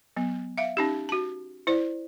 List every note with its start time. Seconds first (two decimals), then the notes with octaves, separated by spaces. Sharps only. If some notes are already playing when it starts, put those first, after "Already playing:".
0.17 F#3 B3
0.58 E5 F5
0.77 C#4 D#4 G4
1.09 F#4 A5
1.67 E4 C5 D5